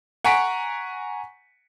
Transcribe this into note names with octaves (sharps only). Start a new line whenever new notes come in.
F#5 G#5 A#5 C#6 B6 D7